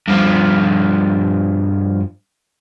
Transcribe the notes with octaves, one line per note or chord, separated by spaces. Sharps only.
G2 F3